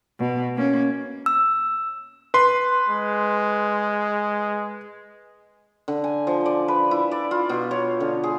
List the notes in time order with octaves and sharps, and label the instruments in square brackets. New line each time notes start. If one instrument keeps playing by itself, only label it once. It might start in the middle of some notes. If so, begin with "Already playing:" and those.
[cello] B2
A#3 C#4
[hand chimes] E6
[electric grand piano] B4 C6
[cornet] G#3
[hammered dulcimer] D3
G#5
F3
D5
B4
E4
D5
F4
B2
C#5
D3
G#4